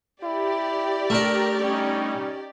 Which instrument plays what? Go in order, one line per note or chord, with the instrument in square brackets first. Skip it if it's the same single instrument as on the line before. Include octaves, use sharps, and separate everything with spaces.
[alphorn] E4 [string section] G4 D5
[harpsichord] A3 D4 [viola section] A#4
[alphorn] G3 [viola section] C#4 D#4